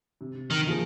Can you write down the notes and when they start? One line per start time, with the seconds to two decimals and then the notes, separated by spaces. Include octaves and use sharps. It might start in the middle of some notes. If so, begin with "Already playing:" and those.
0.21 C3
0.50 D#3
0.67 F3 A#3 F4 G#4